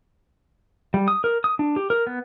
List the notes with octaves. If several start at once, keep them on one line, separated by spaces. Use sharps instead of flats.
G3
D#6
A#4
D#6
D4
G4
A#4
B3